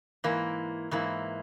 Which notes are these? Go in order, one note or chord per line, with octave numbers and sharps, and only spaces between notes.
G#2 E3 A#3 E4
G#2 E3 A#3 E4